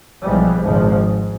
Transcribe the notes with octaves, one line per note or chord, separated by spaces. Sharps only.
B1 B2 E3 F3 G3 G#3
G#1 C#2 A#2 F3 G#3
G#2